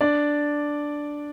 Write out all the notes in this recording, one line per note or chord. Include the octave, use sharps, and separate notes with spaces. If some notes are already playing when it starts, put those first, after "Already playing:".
D4 D5